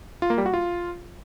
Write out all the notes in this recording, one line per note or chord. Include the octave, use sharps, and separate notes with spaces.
F4
A#3
G3
F#4
F4